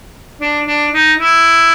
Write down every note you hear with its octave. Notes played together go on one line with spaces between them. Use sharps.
D4
D4
D#4
E4